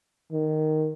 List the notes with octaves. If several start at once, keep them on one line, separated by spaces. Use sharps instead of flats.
D#3